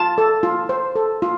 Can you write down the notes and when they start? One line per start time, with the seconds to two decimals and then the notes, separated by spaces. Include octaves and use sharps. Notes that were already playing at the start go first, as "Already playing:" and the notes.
Already playing: F4 A5
0.18 A4
0.43 F4
0.69 C5
0.95 A4
1.22 F4